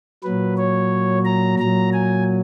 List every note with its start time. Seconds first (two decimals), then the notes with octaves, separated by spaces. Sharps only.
0.23 A#2 F#3 B4
0.58 C#5
1.25 A#5
1.59 A#2 F#3 A#5
1.93 G#5